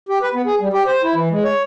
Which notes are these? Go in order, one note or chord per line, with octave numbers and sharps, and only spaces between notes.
G4
B4
B3
G#4
G3
G4
C5
E4
E3
G#3
C#5